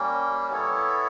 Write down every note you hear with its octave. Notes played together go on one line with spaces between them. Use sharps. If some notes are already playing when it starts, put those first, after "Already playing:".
Already playing: G3 A#3 C#4
B3 E4 A4 C#5